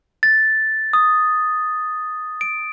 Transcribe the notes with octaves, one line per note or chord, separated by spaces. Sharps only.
A6
D#6
D7